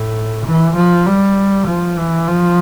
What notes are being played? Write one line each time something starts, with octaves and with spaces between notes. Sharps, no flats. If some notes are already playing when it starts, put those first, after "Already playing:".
Already playing: A2
E3
F3
G3
F3
E3
F3